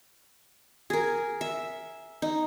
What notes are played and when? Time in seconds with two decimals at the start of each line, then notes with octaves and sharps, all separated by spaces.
0.90 G#4 A#4
1.41 E5
2.22 D#4